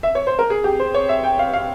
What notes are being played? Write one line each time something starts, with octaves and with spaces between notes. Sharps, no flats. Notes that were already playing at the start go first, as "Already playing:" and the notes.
E5
C#5
C5
A#4
G#4
G4
C5
C#5
E5
G5
F5
F5